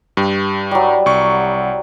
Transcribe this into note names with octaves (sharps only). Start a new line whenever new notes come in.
G2 G4
F#3 G3
C2 C#6